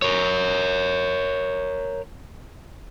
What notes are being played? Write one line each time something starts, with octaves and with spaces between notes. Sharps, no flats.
A#4 C#5